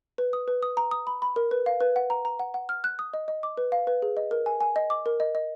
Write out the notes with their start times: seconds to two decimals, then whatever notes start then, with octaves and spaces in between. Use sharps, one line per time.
0.18 B4
0.33 D#6
0.48 B4
0.63 D#6
0.77 A#5
0.91 D#6
1.07 B5
1.22 B5
1.36 A#4
1.51 B4
1.66 F5
1.81 B4
1.96 F#5
2.10 A#5
2.25 A#5
2.39 F#5
2.54 F#5
2.69 F6
2.84 F#6
2.99 D#6
3.14 D#5
3.28 D#5
3.43 D6
3.57 B4
3.72 F5
3.87 B4
4.02 G#4
4.17 D#5
4.31 A#4
4.46 G#5
4.61 G#5
4.76 D#5
4.90 D6
5.06 A#4
5.20 D#5
5.35 D#5